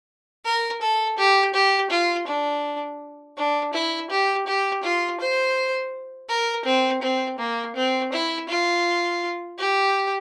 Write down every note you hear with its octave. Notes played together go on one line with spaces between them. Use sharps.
A#4
A4
G4
G4
F4
D4
D4
E4
G4
G4
F4
C5
A#4
C4
C4
A#3
C4
E4
F4
G4